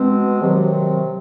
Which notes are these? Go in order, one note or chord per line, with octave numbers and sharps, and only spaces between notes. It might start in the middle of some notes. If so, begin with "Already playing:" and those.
Already playing: B2 G#3 C4
C3 D#3 F#3